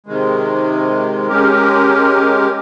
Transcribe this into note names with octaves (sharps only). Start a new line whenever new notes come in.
C3 D#3 G#3
G#3 C#4 G4 A#4